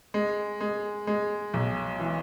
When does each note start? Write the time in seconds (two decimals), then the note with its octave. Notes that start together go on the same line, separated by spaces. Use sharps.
0.14 G#3
0.61 G#3
1.07 G#3
1.54 B1
2.00 E3